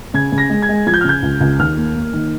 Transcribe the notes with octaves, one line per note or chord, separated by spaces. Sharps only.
C#3 G#6
C#3
A#6
G#3
G#6
G#3
F3 G#6
G6
F6
C#3 G6
C#2
C#2
D#2 F6
A#3
A#3
D#3